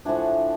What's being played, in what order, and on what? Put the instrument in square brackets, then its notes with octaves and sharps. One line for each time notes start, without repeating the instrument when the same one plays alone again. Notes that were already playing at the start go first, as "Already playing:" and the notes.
[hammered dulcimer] A2 F3 A3 D4 F#5 G#5